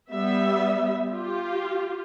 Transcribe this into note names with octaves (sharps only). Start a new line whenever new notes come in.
G3 B3 E5
F4 G4